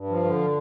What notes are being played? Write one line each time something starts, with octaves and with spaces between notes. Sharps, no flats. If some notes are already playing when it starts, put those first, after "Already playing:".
Already playing: G2
F3
D3